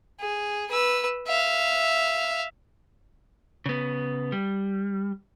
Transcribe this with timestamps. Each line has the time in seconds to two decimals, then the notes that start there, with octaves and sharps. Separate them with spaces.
0.20 G#4
0.71 B4 E6
1.27 E5 F5
3.66 C#3 B3
4.32 G3